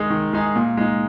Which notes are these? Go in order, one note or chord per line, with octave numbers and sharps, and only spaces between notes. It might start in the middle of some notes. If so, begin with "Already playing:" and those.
Already playing: D#3 G#3 D#4 G#4
D#3
G#3 D#4 G#4
A#2
G#3 D#4